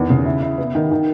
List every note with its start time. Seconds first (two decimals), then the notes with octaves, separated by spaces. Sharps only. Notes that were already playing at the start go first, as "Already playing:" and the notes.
Already playing: E2 D#3
0.10 C#3
0.25 E4
0.42 E4
0.58 B3
0.75 D#3
0.91 D#3